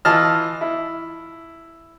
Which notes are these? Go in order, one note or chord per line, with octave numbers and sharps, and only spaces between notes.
E3 F4 D#5 A5 F6
E4